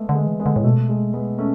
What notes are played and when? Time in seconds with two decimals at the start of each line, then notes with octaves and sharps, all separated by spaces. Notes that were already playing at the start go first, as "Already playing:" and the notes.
Already playing: G#3 A3 B3
0.09 D3
0.15 G#3
0.27 E3
0.40 G#3 B3
0.46 D3
0.56 A2
0.64 B2 A3
0.89 G#3
1.13 G#3 B3
1.39 A3 C#4